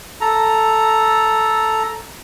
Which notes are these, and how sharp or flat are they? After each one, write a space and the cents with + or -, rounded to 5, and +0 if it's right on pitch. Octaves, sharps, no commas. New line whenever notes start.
A4 +0 A#5 +0